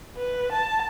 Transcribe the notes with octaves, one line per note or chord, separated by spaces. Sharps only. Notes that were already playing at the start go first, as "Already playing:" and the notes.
B4
A5